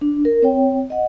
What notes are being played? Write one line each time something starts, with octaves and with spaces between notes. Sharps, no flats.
D4
A#4
C4 C#5 G5
D#5 F#5